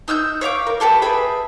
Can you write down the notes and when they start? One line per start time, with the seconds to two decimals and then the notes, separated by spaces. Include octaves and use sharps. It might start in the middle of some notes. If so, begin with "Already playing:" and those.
0.08 D#4 E6 F6 G6
0.41 C#5 E5 F5 D6
0.67 A#4
0.80 G4 A4 B4 G5
1.02 G#4 B4 E5 B5